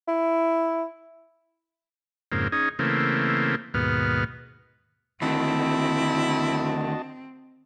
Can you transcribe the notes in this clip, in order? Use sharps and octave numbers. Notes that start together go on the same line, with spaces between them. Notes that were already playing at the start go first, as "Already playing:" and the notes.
E4
F2 G#2 C#3 A#3 C4
C#4 D#4 G#4
C#3 E3 A3 A#3 C4
D#2 G#2 B2 B3 F6
D2 D#3 C4 E4 F#4 D#5 A5